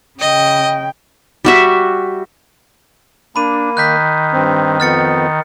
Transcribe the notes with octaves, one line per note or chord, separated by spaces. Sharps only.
C#3 D#5 G5
G3 F#4 E5
A#3 D4 B5 D#7
D#3 F#6 G6 B6
G2 C4
F2 B3 F6 A6 C#7